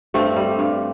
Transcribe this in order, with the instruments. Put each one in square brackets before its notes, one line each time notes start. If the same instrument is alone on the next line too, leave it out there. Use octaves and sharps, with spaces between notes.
[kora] G2 A3 C4
G3
G2